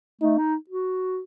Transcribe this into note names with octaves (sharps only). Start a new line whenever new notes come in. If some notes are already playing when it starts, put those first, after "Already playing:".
A3 D#4
D#4
F#4